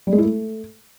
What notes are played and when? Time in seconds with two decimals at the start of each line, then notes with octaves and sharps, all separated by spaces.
0.07 G3
0.13 G#3
0.18 E4
0.24 A3